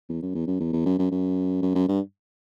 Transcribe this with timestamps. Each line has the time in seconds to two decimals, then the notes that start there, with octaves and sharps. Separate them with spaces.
0.09 E2
0.22 F#2
0.35 E2
0.47 F#2
0.60 E2
0.73 E2
0.86 F#2
0.99 F#2
1.11 F#2
1.62 F#2
1.75 F#2
1.88 G2